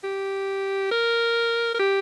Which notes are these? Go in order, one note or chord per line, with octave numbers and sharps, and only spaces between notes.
G4
A#4
A#4
G4